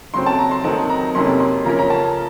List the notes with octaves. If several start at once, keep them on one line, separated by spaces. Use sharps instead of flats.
C#3 F#3 C4 C6
A5
A#5
C6
D#3 F#3 C4 D#4 A5
A#5
F2 C3 F#3 A#3 C#4 C6
C6
C#3 F3 A#3 C#4 A#5
A#5
A5